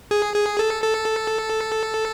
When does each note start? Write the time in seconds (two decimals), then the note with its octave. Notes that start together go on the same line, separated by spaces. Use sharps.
0.11 G#4
0.35 G#4
0.59 A4
0.83 A4